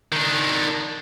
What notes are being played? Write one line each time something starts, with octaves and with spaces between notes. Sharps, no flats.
D#3 D4